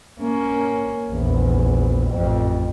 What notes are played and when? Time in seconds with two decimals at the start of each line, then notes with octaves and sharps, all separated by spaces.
0.21 A#3 C#4
1.10 A#1 E2
2.10 A1 F2